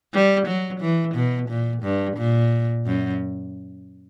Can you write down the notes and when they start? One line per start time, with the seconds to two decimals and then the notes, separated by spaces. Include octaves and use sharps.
0.13 G3
0.47 F#3
0.81 E3
1.15 B2
1.50 A#2
1.83 G2
2.17 A#2
2.86 F#2